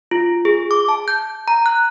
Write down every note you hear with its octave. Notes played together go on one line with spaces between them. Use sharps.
F4
G#4
D6
A5
G6
A#5
F#6